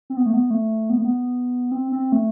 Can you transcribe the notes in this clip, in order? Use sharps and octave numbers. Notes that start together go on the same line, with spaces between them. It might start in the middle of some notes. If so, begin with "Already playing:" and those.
C4
B3
A3
B3
A3
B3
A3
B3
C4
C4
A3